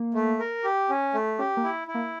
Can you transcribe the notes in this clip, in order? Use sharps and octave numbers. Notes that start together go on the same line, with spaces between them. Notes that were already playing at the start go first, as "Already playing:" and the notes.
Already playing: A#3
A3
A#4
G4
C#4
A3
C#4 G4
A#3
E4
E4
A#3